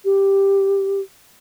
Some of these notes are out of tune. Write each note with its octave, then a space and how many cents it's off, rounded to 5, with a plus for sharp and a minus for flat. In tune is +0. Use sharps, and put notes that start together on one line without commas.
G4 +5